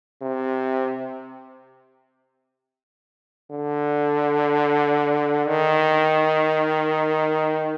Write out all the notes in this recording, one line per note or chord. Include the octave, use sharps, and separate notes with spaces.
C3
D3
D#3